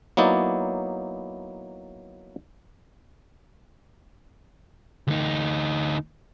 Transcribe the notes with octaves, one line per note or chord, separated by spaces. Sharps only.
F#3 A#3 B3 D#4 E4 D5
D2 D#4